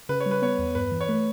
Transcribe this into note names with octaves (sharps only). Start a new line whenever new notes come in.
C#3 B4
C#5
G3
B4
B3 C#5
E2
G2 B4
E3
C#5
A3 B4